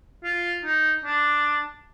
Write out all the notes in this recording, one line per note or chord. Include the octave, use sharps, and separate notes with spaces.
F4
D#4
D4